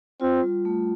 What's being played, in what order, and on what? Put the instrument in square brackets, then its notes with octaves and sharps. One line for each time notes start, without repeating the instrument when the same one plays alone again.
[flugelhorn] C4 [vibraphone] F4
[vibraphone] G3
A3